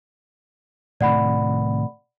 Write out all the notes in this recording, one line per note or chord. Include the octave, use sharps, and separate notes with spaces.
A2 C3 D#3 D5 F#5 B5